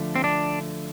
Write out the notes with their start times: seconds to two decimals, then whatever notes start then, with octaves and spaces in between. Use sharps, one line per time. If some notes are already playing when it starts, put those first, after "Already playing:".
Already playing: D3 F3 A3
0.16 C4
0.24 D4